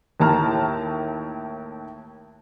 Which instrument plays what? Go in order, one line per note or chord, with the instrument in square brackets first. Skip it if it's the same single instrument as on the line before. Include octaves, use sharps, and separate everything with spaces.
[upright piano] D#2 A2 A5 A#5 F6